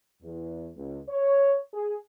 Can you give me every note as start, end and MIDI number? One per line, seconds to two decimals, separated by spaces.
0.23 0.68 40
0.76 1.00 37
1.08 1.56 73
1.74 1.94 68